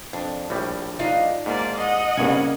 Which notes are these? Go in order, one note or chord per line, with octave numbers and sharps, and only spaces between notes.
F2 D4
A#1 A2 G3
D4 D#4 F4
G#2 A#3 D5
D#5 F#5
C2 G2 C#3 A#3 G#5